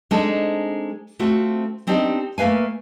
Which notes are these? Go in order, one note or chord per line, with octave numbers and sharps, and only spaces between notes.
G#3 C4 D4 D#4 G#4 A4
A3 C4 F4 F#4
B3 C4 D4 D#4 G4
A3 A#3 B4 F5 G#5